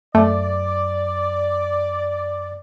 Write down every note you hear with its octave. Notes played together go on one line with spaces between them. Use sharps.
F#2 A3 D5